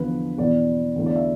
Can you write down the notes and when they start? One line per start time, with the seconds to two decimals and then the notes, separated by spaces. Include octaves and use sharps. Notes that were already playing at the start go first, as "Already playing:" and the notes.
Already playing: E2 D3 F3 B3 B4
0.38 E2 B2 B3 E4 D5
0.96 E2 D3 A3 E4
1.06 D5
1.16 E5